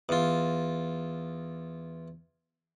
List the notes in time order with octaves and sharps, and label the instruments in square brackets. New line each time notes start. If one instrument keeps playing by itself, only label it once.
[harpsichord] E2 F4